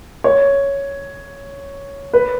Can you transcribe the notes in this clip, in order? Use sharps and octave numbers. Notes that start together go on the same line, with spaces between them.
C#5
B4